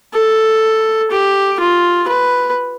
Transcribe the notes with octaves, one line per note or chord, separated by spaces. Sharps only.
A4
G4
F4
B4